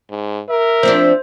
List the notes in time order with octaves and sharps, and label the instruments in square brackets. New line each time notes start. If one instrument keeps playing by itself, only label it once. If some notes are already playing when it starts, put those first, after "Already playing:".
[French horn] G#2
[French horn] A#4 [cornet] E5
[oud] F3 C4 D4 [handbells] C5